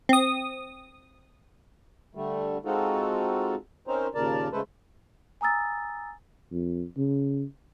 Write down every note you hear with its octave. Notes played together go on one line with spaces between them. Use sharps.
C4 D#6
D3 G3 A3
G#3 C4 D#4 F4 F#4 A4
C4 C#4 D#4 A#4 C5
D#2 A#2 C#3 A#4 D5 A5
C#3 G#3 A3 A4 B4 C5
G#5 A#5 D#6 E6 A6
F2
C#3